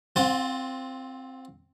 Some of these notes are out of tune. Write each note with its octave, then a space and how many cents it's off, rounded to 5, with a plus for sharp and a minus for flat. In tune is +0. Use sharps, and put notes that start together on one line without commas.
C4 +0 F4 +15 F#5 -35